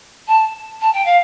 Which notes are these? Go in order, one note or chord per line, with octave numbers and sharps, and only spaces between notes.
A5
A5
G5
F5